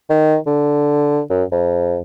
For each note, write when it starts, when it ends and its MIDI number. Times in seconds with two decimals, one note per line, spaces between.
0.10 0.36 51
0.47 1.21 50
1.30 1.43 42
1.52 2.01 41